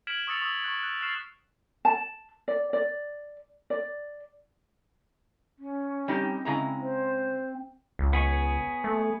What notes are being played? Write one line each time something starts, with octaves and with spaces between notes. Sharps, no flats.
F6 G#6 B6 D7 E7 F#7
C#6 D#6 E6 A6 C#7 F7
C#6 D#6 E6 A6
C#6 F#6 A6
F#6
C#6 F6 F#6 A6 C7 E7
A5
D5
D5
D5
C#4
G3 C4 D#4 G4
C#3 G#3 E4 A#5
C5
C#2
B3 G#4 C#5
A3